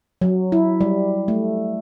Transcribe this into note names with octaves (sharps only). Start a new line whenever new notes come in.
F#3
E4
G3
A3